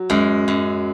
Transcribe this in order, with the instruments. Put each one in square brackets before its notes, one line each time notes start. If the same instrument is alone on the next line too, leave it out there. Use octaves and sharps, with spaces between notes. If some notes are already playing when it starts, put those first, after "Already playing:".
Already playing: [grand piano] F#3
[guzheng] F#2 [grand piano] G#3
[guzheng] F#2